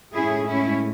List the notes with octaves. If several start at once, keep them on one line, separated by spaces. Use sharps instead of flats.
A2 G#3 C#4 E4 G#4
C#4 E4